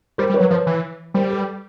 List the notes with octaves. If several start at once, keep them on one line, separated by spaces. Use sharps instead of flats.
G3 A#4 C5
G3
B4 C#5
F#3
F3 B4 C#5
E3
G3 A#4 C5
A4 B4